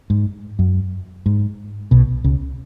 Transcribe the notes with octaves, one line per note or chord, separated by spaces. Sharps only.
G#2
F#2
G#2
B1 B2
C#2 C#3